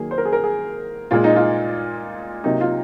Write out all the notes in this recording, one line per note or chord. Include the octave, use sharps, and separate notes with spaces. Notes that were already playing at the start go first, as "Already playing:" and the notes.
Already playing: D#3 F#3 A#3 G#4
C5
A#4
G#4
A#4
G#4
A#2 G#3 F4
D#4
F4
C3 F#3 A#3 D#4
F4